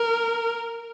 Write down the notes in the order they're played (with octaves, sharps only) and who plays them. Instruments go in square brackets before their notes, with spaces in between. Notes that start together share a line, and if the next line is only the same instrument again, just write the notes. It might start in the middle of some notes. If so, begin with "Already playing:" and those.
Already playing: [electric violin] A#4